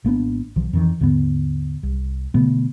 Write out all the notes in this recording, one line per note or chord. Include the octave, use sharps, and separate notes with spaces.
G#1 A#3 B3 D4
B1 D#3 F3
F2 D#3 E3
D#2 G#2 D3 B3
C2
B2 D3 A3 B3